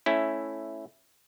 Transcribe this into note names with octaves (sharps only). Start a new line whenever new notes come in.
A3 C#4 E4